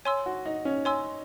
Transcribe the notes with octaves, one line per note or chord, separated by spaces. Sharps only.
C#5 G#5 C6 E6
F#4
D#4
C#4
C#5 G#5 C6 E6